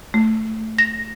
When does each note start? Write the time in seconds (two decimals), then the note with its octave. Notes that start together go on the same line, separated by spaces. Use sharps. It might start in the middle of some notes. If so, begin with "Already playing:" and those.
0.14 A3
0.78 A#6